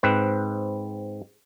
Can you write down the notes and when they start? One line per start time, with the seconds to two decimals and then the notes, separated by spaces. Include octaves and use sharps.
0.03 G#2 C4 B4